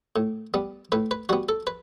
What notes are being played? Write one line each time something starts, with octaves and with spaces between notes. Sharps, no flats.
A2
G3 B3
A2 B4
B4
G3 B3 F#4
A4
B4